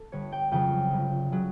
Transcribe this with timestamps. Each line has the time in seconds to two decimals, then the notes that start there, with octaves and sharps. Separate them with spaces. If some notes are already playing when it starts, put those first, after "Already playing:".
Already playing: A4
0.12 G1 C#5
0.32 G5
0.51 F2 C#3 F#3 G5
0.91 G1
1.32 C#3 F#3